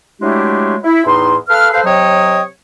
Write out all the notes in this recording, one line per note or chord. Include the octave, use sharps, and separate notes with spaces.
F#3 G#3 A3 D4 E4 G4
E4
E2 A2 D#4 C6
A4 B4 F5 F6
A4 B4 C5 F5
C3 F#3 C#5 D#5 G5 D#6